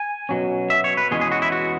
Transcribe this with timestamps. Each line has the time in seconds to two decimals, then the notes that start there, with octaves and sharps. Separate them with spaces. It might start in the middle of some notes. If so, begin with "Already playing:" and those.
Already playing: G#5
0.29 B2 F#3 C#4
0.70 E5
0.84 C#5
0.97 B4
1.11 E2 B2 G#3 C#4 G#4
1.21 G#4
1.32 F#4
1.42 E4
1.52 F#4